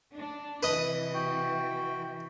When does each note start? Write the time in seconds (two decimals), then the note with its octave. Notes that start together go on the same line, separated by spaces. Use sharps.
0.14 D4
0.63 C3 E3 B4 D#5
1.14 F#4 G5